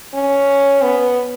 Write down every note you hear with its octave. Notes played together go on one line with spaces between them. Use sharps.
C#4
B3